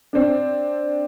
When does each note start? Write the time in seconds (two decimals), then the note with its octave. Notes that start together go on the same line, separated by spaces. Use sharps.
0.13 C4 D4